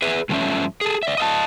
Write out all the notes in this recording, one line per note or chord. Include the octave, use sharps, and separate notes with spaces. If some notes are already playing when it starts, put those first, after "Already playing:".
G#4 B4 E5
G2 C#3 F3 A3 C#4 E5
G#4 A4
D5 E5
D#5 F5 A5